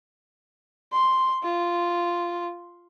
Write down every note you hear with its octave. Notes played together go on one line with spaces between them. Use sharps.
C6
F4